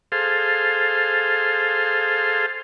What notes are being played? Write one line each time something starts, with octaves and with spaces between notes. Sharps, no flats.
G#4 A4 C5 F5